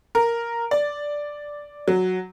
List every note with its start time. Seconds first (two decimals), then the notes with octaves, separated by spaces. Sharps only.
0.15 A#4
0.71 D5
1.88 F#3